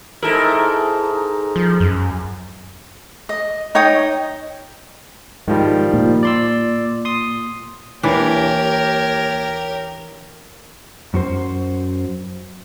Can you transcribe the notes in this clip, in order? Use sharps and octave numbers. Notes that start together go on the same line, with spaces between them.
G#2 E4 A4 A#4
F3
F#2
D#5
D#4 C#5 G5 D#6
G#2 D#3 F3 G3
A#2
D5 C6 E6
C6 D#6
D#2 E3 D4 G4 A#4 C#5
F#2 F#4 C5